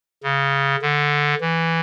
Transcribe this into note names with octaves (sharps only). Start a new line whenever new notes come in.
C#3
D3
E3